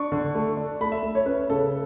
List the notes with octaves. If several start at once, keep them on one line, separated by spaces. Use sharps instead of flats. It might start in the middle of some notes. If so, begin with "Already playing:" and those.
Already playing: D4 C#6
D3
A3
D4
A3 B5
E5
A3
C#5
C#4 B4
C#3 A4